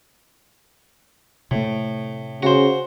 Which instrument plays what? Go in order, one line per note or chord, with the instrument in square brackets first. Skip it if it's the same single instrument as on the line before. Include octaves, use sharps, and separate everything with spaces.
[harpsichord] A2 [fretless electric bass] C3 A3
[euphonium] C#3 [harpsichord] F#4 C5